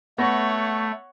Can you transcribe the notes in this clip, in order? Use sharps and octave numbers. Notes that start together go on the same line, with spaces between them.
A3 B3 C#5 F#5 C#6 A#6